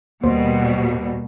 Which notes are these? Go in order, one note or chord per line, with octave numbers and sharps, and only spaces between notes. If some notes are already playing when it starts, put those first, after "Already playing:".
D#2 B2 G3 A#3 C5